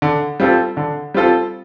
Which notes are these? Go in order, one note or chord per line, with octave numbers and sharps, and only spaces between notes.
D3
G3 C4 F4 A4
D3
G3 C4 F4 A4